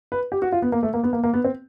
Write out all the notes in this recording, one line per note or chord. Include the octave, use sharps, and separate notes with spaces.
B4
G4
F#4
F4
B3
A#3
A3
A#3
B3
A#3
A#3
B3
C4